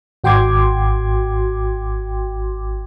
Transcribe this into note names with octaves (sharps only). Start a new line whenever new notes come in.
G#1 F#4 G5 C6 D6 G#6